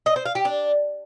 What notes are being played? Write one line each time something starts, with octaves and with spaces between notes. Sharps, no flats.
D#5
C5
F5
G4
D4